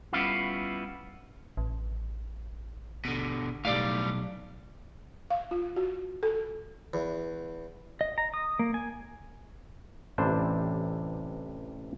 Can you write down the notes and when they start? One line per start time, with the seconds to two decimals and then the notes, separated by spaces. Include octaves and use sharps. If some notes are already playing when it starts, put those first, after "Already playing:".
0.13 G3 B3 C#4 E4 F4
1.57 A1
3.05 B2 D3
3.65 B1 A2 G3 D5 F5
5.30 F5
5.51 F4
5.76 F#4
6.23 A4
6.94 E2
8.01 D#5
8.18 A#5
8.34 D#6
8.59 A#3
8.74 G#5
10.18 A1 C3 E3 D4 C5